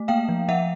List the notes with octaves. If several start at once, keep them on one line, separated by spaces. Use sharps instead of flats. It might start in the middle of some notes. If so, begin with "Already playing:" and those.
Already playing: A3
A#3 F5 G5
F3
F3 E5 F#5